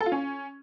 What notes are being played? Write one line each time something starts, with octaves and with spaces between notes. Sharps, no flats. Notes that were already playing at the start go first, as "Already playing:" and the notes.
A4
F4
C#4